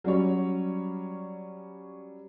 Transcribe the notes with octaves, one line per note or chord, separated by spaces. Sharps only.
F#3 G3 C#4 C#5